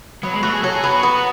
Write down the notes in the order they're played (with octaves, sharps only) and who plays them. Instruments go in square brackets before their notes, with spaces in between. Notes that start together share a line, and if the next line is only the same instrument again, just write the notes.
[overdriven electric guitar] F#3 [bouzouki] B3
[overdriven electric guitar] G#3
[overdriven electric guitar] A3 [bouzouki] F#4
[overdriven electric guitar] G#4
[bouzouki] F#3 [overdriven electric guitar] A4
[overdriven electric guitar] G#4
[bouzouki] B3
[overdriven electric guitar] F#4
[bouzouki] B3